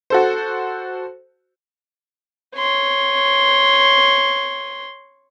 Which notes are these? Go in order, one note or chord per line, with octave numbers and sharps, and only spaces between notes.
F#4 A4 C5
C#5 C6